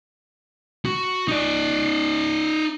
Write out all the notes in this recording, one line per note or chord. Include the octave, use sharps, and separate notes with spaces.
F#4
D#4 D5